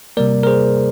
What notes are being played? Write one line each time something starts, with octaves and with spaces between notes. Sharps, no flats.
C3 G3 A#3 A#4 D5
A#4
G#4 C5